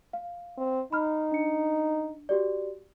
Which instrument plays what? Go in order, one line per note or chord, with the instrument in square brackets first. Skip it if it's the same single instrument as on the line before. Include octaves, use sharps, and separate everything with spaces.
[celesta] F5
[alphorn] C4
[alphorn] D#4 [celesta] B5 F6
[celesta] D4 C#7
F#4 G4 D5